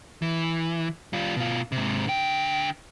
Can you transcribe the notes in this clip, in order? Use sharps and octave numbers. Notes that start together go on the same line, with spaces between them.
E3
G3 F4
B2 F4
G#2 C3
D3 G5